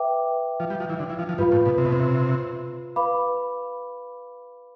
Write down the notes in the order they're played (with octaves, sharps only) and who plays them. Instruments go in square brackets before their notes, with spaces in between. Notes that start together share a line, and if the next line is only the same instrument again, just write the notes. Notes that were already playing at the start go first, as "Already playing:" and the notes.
Already playing: [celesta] B4 E5 G5 D6
[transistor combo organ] F3
G3
F3
E3
D3
E3
F3
F3
[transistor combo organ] G2 [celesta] F4 B4 F5 B5
[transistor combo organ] A2
B2
C3
B2
C3
[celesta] B4 F5 B5 D6